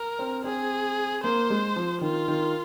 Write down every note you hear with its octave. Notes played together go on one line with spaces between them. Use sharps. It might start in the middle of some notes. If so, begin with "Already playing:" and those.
Already playing: A#4
C4
C4 G#4
A#3 C5
G#3
F3
D#3 F4
D#3